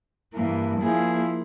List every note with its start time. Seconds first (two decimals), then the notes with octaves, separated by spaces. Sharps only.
0.34 G2 E3 A#3
0.81 F3 A#3 E4 G#4